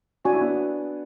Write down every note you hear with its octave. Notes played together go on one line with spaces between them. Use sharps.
D4 F#4 C#5 G#5 C#6
E4
B3 D4